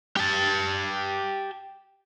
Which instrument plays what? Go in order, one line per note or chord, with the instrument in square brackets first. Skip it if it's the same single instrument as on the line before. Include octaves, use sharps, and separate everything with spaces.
[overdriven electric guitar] G4 A5